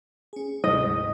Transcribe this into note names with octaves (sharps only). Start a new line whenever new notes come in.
C#4 G#4
D2 G#2 C3 D#5